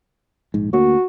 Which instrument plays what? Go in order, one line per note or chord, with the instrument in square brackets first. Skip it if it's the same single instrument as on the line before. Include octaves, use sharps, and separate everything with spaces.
[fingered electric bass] A#1 G#2
[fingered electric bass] D2 A#3 [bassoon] F#4